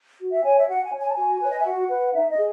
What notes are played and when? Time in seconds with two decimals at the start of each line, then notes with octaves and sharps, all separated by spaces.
0.20 F#4
0.32 E5
0.44 C#5 G#5
0.57 E5
0.68 F#4 F#5
0.84 G#5
0.93 C#5
1.01 G#5
1.08 A5
1.15 F#4 G#5
1.41 B4 C#5
1.51 D#5
1.59 E5
1.65 F#4 F#5
1.89 B4
2.13 D#4 E5
2.30 D#5
2.37 G#4